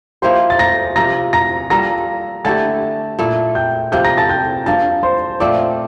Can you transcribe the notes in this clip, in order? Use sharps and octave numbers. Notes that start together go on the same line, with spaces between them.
F3 A#3 E4 G4 C5 C6
A6
A#5 A#6
C3 F3 A#3 A#5 A#6
A#5 A#6
G3 A#3 F4 A4 A#5 A#6
D3 A3 E4 G4 A5 A6
A#2 A3 E4 A4
G5 G6
C3 F3 A#3 F4 G5 G6
A#5 A#6
A5 A6
G5 G6
G2 F3 A#3 A5 A6
C5 C6
A#2 F3 A3 C4 D5 D6